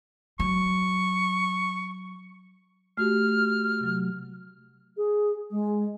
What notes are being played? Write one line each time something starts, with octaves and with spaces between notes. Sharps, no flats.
F#3 C#6
A3 F#4 G4 F6
C3 F#3
G#4
G#3